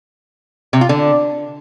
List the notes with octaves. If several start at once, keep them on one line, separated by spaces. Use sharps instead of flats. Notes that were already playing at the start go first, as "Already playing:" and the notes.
C3
F4
D3